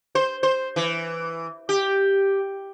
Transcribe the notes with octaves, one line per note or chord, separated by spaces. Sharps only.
C5
C5
E3
G4